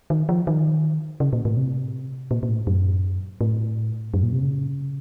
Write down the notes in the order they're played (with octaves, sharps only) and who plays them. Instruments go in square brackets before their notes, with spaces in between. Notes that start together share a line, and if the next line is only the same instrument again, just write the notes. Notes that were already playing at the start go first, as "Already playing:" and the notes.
[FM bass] D#3
F3
D#3
C#3
A#2
A2
C3
A#2
A#2
A2
F#2
A2
F#2
A#2
C3
C#3